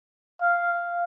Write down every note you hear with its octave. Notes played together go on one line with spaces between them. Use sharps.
F5